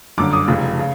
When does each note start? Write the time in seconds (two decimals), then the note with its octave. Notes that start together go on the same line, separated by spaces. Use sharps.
0.18 G1 F#2 D3 D6
0.33 D#6
0.48 F1 F2 C#3
0.79 C#3